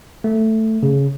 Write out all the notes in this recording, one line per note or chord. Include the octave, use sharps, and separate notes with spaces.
A3
C#3